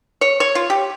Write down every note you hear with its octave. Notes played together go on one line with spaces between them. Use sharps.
C#5
C#5
F4
G4